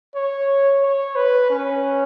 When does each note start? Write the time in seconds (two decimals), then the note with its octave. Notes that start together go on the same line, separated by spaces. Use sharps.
0.15 C#5
0.83 C#5
1.16 B4
1.50 C#4